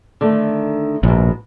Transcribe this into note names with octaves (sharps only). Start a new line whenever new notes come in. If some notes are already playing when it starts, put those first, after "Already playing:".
D3 D#3 A3
A#1 G#2 B2